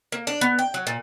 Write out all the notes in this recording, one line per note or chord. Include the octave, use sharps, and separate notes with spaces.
A#3
D4
B3
G5
F#3
A#2